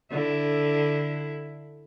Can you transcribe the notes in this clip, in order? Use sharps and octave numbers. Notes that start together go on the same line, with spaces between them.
D3 E4